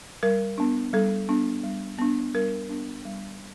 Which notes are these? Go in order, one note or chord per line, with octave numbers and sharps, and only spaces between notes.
G3 A#4
B3 D4
G3 A4
B3 D4
G3
B3 D4
G3 A#4
B3 D4
G3